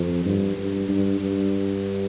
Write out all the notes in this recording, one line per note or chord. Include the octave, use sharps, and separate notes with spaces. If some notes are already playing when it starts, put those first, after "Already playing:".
Already playing: F2
G2
G2
G2
G2